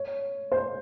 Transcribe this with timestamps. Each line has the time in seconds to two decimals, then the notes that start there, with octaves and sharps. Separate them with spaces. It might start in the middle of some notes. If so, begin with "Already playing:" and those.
Already playing: C#5
0.52 C5